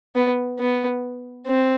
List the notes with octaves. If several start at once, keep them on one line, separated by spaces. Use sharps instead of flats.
B3
B3
C4